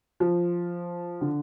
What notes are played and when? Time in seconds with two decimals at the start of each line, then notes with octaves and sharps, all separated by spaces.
0.20 F3
1.21 D3